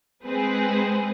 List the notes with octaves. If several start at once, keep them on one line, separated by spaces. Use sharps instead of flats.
G#3 C4 G#4 B4